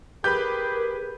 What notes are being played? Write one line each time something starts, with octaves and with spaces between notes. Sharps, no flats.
G4 G#4 A#4 B4 B5 G6